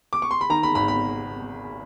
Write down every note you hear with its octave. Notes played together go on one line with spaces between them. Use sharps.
D6
C#6
C6
B5
D#3 A#5
B5
G#1 B5
B5